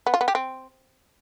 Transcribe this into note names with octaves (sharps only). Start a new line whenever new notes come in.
B3
F4
B3
G4
C4